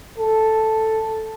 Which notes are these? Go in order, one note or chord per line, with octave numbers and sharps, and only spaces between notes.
A4